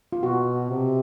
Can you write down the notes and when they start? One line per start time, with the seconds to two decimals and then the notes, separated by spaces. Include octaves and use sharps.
0.13 F4
0.23 B2 F#4
0.70 C3